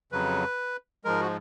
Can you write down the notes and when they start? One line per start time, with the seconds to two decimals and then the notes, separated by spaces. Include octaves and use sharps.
0.12 F2 C#3 F#3 B4
1.05 G#2 F3 G#3 A#4
1.21 F#4